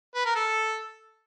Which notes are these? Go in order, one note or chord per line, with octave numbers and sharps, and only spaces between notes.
B4
A#4
A4